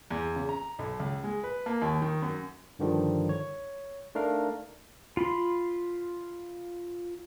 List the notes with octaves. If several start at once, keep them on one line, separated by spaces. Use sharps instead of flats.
E2
C#3
A#5
B1
C#2
G#3
B4
A#3
D#2
D#3
F#2
G2 D3 D#3 F3 G3
C#5
A3 D4 D#4 A#4 F5
F4 B5 C6